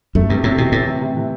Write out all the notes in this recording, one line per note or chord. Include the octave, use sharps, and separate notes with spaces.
F#2 A3
G2 C3
A2 C3
B2 E3
A2 A3
C3
C3
E3